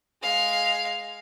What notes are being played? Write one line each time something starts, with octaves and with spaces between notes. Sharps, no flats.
G#3 F5